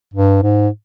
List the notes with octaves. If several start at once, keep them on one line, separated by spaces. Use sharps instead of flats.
G2
G#2